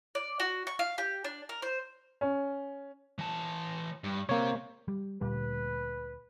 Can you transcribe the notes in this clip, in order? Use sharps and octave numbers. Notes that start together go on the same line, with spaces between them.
D5
F#4
C#6
F5
G4
D4
A#4
C5
C#4
E3 A5
G2
C3 A#3 C#5
G3
D2 A#2 G3 B4